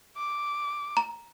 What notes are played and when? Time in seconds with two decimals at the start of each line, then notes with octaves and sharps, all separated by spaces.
0.17 D6
0.97 A#5